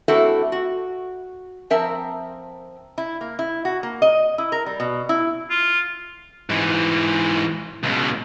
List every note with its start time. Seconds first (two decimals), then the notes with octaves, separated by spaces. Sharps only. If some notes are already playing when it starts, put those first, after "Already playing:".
0.08 A3 C4 D4 E4 F#4 A4
0.52 F#4
1.70 F3 C4 A#4 E5 A5
2.98 E4
3.21 A#3
3.39 E4
3.65 F#4
3.83 A#3
4.02 D#5
4.38 E4
4.52 A#4
4.66 G3
4.80 B2
5.09 E4
5.50 F4
6.50 G#2 E3
7.83 C#2 B2